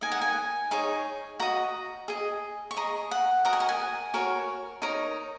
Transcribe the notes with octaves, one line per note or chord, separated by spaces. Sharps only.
D#4 A#4 D#5 G#5
F#5
G#5
D#4 G#4 C#5
F#4 D#5 A#5
G#4 D#5
C#6
G#4 D#5 A#5
F#5
F#4 A#4 D#5 A#5
G#5
F#5
G#5
F#4 A#4 C#5
D#4 A#4 C#5 A#5